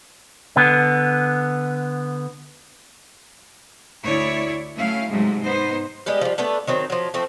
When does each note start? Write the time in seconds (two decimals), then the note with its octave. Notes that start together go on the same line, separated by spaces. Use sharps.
0.56 D3 B3
4.03 D2 E4 C#5 D5
4.76 F#3 A3 C#4 E4 F5
5.09 G#2 C3 F#3 G#3 A3
5.43 B3 D#4 C5
6.06 G3 G#3 B3 G4
6.21 F3 G3
6.38 A3 B3 D4 B4
6.67 D#3 F#3 C4
6.90 F3 F#3
7.14 F3 A3 C4